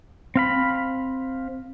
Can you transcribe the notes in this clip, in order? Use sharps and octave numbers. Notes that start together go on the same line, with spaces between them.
C4 F5 B5